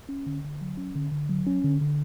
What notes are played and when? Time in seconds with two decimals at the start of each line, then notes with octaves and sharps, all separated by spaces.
0.09 C#4
0.27 D3
0.44 D3
0.61 F#3
0.77 C#4
0.96 D3
1.12 D3
1.30 F#3
1.47 C#4
1.64 D3
1.81 D3